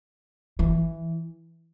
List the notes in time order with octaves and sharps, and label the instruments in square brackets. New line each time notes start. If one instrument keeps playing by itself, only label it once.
[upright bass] E3